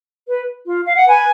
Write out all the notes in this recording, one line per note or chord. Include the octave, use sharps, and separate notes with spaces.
B4
F4
F5
F#5
B4 G#5